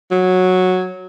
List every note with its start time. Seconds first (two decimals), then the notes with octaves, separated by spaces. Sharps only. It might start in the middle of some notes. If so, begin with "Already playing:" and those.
0.11 F#3